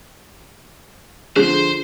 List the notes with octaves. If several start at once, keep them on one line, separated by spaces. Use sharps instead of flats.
D3 F3 G#4 C5